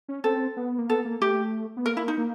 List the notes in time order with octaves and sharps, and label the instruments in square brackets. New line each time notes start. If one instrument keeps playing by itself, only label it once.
[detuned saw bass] C#4
[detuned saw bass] C4 [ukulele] A4
[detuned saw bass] B3
A#3
[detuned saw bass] B3 [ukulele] A4
[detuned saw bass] A#3
[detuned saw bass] A3 [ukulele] G4
[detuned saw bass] B3
[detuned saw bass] A#3 [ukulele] A#4
[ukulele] E4
D#4
[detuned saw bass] A#3